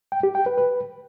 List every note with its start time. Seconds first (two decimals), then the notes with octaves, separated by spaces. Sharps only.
0.12 G5
0.23 G4
0.35 G5
0.46 B4
0.58 B4